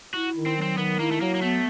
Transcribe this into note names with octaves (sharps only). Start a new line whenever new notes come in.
E4 F#4
D#3
C4
F#3
C4
D#3 B3
A#3 E4
A3
F#3 A#3
A#3
A3 B3